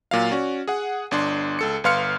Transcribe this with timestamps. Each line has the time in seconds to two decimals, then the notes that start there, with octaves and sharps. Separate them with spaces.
0.11 A#2 F#3 F5
0.32 C#4 F#4 D5
0.68 G#4 F#5
1.11 G1 D4 C6
1.59 C#2 A4 C#7
1.84 G1 B4 F5 C6 F6 C#7